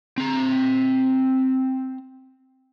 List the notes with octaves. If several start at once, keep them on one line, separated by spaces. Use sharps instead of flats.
C4 A#5